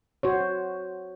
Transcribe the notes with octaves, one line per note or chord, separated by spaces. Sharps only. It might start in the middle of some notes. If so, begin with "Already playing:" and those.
F#4 C5 C#5